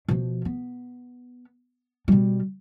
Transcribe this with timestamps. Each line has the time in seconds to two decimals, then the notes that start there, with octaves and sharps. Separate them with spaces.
0.08 B2 F3
0.45 B3
2.08 B2 G3